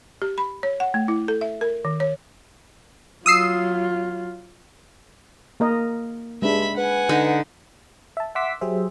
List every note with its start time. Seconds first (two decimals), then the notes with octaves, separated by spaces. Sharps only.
0.22 G4
0.38 B5
0.63 C#5
0.80 F#5
0.94 A3
1.08 E4
1.28 A4
1.41 E5
1.61 A#4
1.85 D#3
2.00 C#5
3.26 F#3 F4 D#6 E6 C7
5.60 A#3 A#4 D#5
6.42 G2 G#3 D4 E5 B5
6.78 B4 F#5 G#5
7.09 D3 D#4
8.17 E5 A5
8.35 E5 F#5 C6 D6 E6 B6
8.61 F#3 G4 G#4 C5 E5